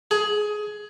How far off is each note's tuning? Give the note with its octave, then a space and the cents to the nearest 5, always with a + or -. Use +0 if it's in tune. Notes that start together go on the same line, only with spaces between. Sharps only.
G#4 +15